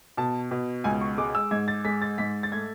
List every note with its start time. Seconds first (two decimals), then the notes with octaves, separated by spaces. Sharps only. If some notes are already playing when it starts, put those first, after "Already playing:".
0.17 B2 A5
0.51 B2
0.84 C#2 G#5
1.01 C#6
1.18 G#3 D6
1.35 E6
1.51 G#2 G#6
1.68 A6
1.85 G#3 B6
2.02 A6
2.18 G#2 B6
2.43 A6
2.52 A3 G#6